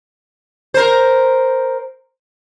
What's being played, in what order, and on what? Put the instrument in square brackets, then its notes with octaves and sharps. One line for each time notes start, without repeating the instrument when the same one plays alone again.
[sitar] A#4 C5